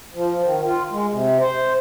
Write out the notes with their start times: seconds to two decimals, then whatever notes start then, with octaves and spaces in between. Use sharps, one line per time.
0.14 F3
0.43 D#3
0.64 F4
0.91 G#3
1.11 C3
1.40 C5